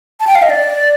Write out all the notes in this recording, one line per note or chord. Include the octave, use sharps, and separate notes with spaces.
A5
G5
F5
D#5
D5